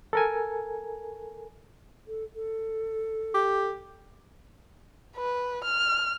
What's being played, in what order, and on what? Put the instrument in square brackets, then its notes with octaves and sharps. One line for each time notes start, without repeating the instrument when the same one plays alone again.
[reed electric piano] A4 A#4 G#5
[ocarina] A4
A4
[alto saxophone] G4
[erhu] B4
F6